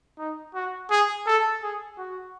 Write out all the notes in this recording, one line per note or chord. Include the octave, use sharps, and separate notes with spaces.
D#4
F#4
G#4
A4
G#4
F#4